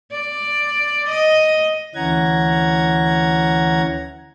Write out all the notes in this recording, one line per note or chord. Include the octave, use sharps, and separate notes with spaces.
D5
D#5
D2 E3 C#4 F#5 A#5 G#6